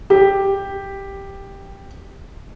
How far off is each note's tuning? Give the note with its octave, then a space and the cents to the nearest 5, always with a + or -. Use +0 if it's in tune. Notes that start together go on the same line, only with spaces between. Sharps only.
G4 +5